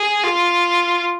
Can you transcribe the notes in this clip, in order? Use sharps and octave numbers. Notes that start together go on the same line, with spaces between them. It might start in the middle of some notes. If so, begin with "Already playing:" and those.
Already playing: G#4
F4